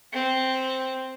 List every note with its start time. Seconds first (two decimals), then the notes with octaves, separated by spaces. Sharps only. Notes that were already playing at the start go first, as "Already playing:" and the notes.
0.13 C4